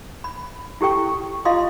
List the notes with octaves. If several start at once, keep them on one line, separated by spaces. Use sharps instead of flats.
B5
E4 G4 A4 G5 C#6
F4 D#5 F5 C6 D#6